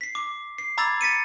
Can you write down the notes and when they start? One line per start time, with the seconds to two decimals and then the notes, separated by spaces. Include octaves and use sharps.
0.01 B6 C7
0.15 D6
0.58 C7
0.78 A#5 B5 D6 E6 G#6 A6
1.01 A6 B6 C#7 D#7